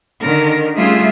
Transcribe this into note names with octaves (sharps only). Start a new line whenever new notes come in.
D3 D#3 A#4
G3 A3 C#4 F4 G#4 E5